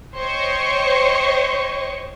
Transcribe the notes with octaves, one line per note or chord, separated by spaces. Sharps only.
C5 C#5 D#5 G5 C#6